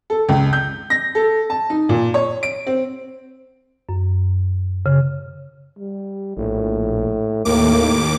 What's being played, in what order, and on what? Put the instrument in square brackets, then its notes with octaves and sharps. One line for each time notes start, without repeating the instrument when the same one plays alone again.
[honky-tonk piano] A4
C#2
G6
A#6
A4
A5
D#4
A#2
C#5
D7
C4
[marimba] F#2
C#3
[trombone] G3
[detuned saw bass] A#1 [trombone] A2
[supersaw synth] D#2 D6 [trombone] A2 [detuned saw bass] A#3